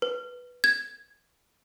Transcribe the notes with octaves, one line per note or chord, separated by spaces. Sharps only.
B4
G#6